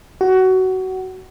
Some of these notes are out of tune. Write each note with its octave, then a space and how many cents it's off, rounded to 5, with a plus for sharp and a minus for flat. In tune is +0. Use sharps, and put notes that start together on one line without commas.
F#4 +20